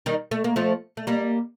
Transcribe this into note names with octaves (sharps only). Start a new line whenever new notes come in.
D#3 G3
A3
A#3
F3 A3
A3
G3 A#3